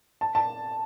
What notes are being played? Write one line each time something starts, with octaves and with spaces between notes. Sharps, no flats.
A5
A5